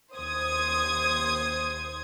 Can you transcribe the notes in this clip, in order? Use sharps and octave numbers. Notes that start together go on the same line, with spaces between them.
D#2 C5 D#6 G#6